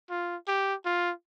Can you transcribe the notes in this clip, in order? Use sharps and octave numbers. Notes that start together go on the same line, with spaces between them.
F4
G4
F4